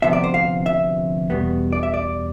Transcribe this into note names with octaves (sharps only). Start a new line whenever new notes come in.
D2 C3 F3 B3 E5
D5
C5
F5
E5
E2 B2 G3 B3
D5
E5
D5